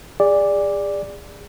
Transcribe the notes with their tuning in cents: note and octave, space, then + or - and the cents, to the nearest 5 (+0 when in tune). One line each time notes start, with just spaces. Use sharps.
G#4 -30 D5 +0